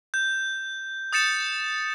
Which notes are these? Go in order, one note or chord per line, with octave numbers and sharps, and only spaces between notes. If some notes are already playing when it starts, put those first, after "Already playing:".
G6
D#6 G6 A6 C#7 E7